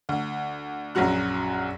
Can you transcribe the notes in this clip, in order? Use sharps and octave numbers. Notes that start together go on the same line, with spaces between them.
D2
A#1 F#2 F#3 F#4 F#6